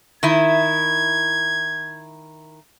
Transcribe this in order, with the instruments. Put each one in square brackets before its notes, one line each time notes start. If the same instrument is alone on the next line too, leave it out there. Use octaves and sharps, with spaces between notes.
[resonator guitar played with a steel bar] D#3 E4 [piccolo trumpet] G#6